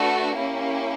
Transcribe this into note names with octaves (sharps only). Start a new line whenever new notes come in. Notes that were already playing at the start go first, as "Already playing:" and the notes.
Already playing: A3 D4 F#4 B4
A#3 C#4 E4 G4